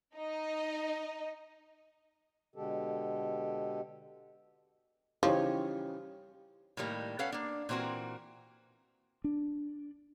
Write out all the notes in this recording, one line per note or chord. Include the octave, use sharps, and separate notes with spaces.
D#4 D#5
B2 D3 G#3 G4 A4
C#3 E3 F3 D#4 G4 C#5
A2 D#3 G3 A#3
C#4 A4 B4 F5 F#5
A#3 D4
A#2 E3 C4 F#4 A#4
D4